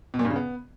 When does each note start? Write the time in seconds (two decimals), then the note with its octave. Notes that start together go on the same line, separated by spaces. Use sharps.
0.14 B2
0.19 A#2
0.25 G2
0.30 C#3
0.36 B3